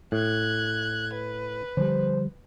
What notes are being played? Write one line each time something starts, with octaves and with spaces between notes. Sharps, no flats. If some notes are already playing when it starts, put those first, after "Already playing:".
A2 F#6 G#6
B4
D3 F3 G3 C5